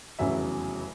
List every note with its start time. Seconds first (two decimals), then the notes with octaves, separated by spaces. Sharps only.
0.19 F1 E2 C#3 F#3 E5